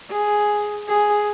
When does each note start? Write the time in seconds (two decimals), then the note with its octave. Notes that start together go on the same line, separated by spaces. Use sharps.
0.11 G#4
0.88 G#4